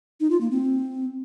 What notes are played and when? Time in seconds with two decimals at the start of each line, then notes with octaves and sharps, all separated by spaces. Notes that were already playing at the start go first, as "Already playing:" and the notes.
0.20 D#4
0.31 F4
0.41 A#3
0.51 C4